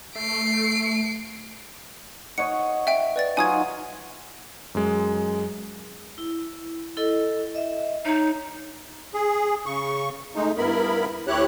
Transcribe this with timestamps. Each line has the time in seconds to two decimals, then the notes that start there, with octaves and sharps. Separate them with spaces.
0.15 A3 C7 D7
2.38 C#5 D#5 F#5 C#7
2.87 E5 G5 D7
3.16 B4 D5 A6
3.37 F#3 D#4 F4 G#5 D#6 G#6
4.75 F#2 G#3
6.18 E4
6.97 E4 A4 D#5
7.55 D#5 E5
8.05 D#4 C#5
9.14 G#4
9.66 C#3 C#6
10.36 G#3 A3 D#4
10.57 G2 B3 E4 A#4 B5
11.28 D2 E4 G4 C#5 F#6